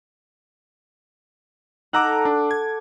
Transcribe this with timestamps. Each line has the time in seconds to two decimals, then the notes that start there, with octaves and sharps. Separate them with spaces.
1.93 D#4 A4 F#5 A#5 D6 E6
2.25 D4
2.51 G#6